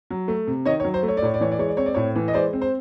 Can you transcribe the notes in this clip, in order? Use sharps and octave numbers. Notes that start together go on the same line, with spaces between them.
F#3
A3
C3
D#3 C#5 D#5
C#5
F#3
C5
A3
C#5
D5
A2 C#5
D5
E3 C#5
D5
G#3 C#5
D5
C4 C#5
D5
A2 C#5
E3
D#5
G#3 C5 D5
C4
C5